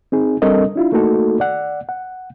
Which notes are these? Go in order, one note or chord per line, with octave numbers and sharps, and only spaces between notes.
C4 D#4 G#4
G3 C4 D4 A4 A#4 D#5
D4 E4 F4
A3 A#3 D#4 F#4 A4
D5 F#5
F#5